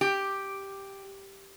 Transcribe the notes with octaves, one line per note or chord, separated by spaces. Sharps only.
G4